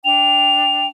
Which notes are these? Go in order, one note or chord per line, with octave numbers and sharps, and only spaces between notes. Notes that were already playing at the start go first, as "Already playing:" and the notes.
D4 G5 F7